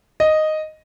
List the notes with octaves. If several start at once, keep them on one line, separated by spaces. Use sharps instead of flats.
D#5